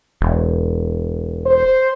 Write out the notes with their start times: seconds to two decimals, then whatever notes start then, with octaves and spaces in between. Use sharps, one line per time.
0.21 E1
1.46 C5